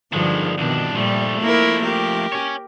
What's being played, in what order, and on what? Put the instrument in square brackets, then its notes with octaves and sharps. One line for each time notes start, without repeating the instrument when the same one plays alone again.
[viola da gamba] G2 D3 F3 [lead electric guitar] D#3 G#3
[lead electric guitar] C2 D4 [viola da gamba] B2 D#3
[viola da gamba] A#2 G3 [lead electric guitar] F3 A3
[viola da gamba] A#3 E4 A#4
G4 A#4
[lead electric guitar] C#5 G#5